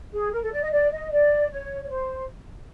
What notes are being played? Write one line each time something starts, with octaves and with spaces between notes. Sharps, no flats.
G#4
A#4
A4
D5
D#5
D5
D#5
D5
C#5
C#5
C5